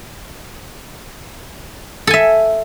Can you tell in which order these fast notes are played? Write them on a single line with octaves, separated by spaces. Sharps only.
A4 G#5 E5